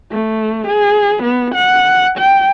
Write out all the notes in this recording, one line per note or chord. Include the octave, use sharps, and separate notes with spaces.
A3
G#4
B3
F#5
G5